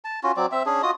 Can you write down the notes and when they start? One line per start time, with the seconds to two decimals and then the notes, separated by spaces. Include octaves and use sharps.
0.04 A5
0.23 C#4 F4 F#4
0.37 F#3 C4 D5
0.52 C4 E5
0.66 C#4 D4 G#4
0.83 F4 F#4 D#5 D#6